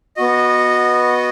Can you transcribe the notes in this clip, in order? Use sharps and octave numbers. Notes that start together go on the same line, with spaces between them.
B3 F#4 D#5